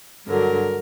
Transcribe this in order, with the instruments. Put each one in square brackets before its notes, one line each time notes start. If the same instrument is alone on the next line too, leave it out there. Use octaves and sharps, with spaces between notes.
[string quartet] G2 D3 F#3 A#4